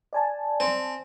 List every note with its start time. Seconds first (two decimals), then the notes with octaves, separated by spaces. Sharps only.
0.13 D5 G#5 A5
0.60 C4